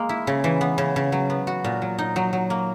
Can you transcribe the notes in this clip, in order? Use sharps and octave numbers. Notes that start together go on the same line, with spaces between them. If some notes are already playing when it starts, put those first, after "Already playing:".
Already playing: G#3 A#3
E4
C#3
E3
B3
C#3
C#3
F#3
B3
F#4
A#2
F#3
D#4
F#3
F#3
A#3